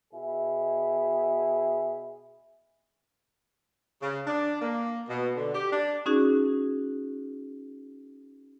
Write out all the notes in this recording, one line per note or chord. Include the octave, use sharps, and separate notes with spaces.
B2 E4 G#4
C#3
D4
A#3
B2
D3
G4
D4
C#4 D#4 F#4 G#4